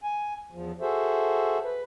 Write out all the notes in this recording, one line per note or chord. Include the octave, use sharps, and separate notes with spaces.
G#5
E2 F3
F#4 G#4 A4 C5 E5
B4